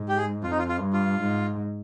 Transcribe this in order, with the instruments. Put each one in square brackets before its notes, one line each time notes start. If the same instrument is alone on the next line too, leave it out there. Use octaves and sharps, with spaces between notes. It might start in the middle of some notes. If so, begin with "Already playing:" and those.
Already playing: [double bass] G#2
[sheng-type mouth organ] G4
G#4
[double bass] F2 [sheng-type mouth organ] F4
[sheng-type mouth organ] D#4
F4
F4
[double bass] G2
[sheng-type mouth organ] F4
[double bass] G#2